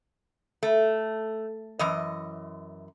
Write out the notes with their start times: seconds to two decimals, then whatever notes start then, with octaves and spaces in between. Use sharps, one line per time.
0.63 A3
1.79 F#2 E3 D#5